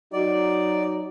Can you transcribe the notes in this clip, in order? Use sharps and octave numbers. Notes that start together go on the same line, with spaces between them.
F#3 D#4 F#4 D5